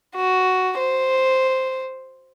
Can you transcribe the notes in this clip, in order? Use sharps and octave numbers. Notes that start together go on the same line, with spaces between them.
F#4
C5